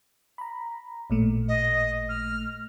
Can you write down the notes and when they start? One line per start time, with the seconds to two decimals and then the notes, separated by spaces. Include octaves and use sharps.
0.38 A#5 B5
1.10 A1 A#2 A3
1.48 D#5
2.09 F6